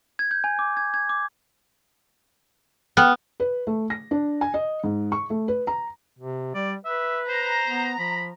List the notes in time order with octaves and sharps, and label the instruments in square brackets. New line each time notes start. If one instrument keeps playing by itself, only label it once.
[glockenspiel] G#6
G6
G#5
D6
G#6
G#6
D6
[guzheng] B3 [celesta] G5 F6 F#6
[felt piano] B4
A3
A#6
D4
G#5
D#5
G#2
C#6
A3
B4
A#5
[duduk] C3
[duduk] G3 [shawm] D5
[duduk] B4 [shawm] E5
[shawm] C5 [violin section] A#5
[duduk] B3
[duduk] F3 [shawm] B5